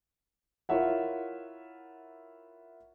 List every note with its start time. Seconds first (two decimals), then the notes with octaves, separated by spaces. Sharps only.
0.69 E4 F4 A#4 C#5 E5 F#5